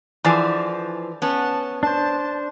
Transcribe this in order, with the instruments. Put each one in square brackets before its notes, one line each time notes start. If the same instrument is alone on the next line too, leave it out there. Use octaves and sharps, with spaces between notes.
[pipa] D3 G#4 D5 [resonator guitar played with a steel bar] E3 F3
[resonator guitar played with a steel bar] B3 C#4 [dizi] A5
[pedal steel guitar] D4 C5 [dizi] A5